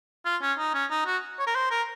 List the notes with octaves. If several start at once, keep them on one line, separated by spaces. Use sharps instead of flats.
F4
C#4
D#4
C#4
D#4
F#4
C#5
A#4
C5
A#4